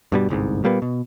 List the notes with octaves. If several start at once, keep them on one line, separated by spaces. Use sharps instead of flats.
G2 B2 G3
G1 C2 G#2
A#2 G3 A#3 B3
B2